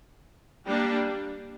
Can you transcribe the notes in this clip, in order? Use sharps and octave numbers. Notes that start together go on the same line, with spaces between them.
G3 A#3 D4